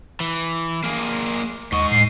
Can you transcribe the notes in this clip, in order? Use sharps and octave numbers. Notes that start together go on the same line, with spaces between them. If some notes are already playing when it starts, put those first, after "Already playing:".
E3
A#3 G#4
D#2 G#2 D#5 C#6
A2 C7